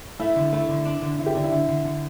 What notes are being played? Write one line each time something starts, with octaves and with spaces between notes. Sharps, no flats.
A3 E4
D3
A3 E4
D3
D4
D3
D3 E4
G4
D3 D4
E4
D3
D3
D3